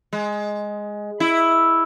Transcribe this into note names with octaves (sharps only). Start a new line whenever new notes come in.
G#3
E4